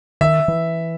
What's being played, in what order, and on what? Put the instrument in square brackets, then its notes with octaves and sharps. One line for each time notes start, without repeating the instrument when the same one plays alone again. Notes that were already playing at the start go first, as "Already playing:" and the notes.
[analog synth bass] D#3 [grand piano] E5
[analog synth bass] E3